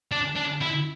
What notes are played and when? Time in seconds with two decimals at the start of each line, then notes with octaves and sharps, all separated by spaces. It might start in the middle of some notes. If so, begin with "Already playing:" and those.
0.12 D4
0.36 D4
0.61 E4